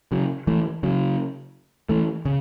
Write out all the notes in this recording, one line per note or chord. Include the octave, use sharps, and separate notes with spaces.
C#3 F#3
E3 A3
C#3 F#3
E3 A3
C#3